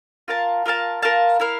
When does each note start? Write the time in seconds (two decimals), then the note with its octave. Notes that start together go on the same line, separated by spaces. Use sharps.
0.28 F4 A#4 F5 A5
0.66 F4 A#4 F5 A5
1.02 F4 A#4 F5 A5
1.40 E4 A#4 F5